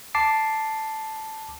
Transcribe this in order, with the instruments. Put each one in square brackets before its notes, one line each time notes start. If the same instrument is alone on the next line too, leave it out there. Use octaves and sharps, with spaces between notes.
[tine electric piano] A5 D6 C7